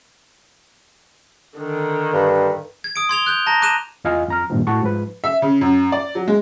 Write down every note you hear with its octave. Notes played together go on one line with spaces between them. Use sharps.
D3 D#3
G2
G#6
D#6 D7
C6 G#6 F7 G7
F#6 G6 F7
A5 A#5 A#6
D6 F#6 D#7 E7
E2 F4 D#5 F5 G#5
F2 A#5 F6
G2 A#2 D#3 F3
A2 F#4 A5 C#6
G#2 F3 B4
E5
C#3
F#2
D5
F#3
G#3